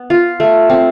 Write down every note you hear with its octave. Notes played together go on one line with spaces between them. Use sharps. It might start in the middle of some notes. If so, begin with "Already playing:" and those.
Already playing: B3
F4
A3
C4